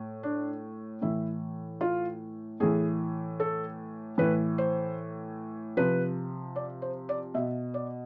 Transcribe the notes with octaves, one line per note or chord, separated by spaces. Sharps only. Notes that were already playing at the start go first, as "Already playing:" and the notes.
Already playing: A2
D4
A2 E3 E4
F4
A2 E3 G#4
A4
A2 E3 B4
C5
C3 F3 B4
D5
C5
D5
B2 E5
D5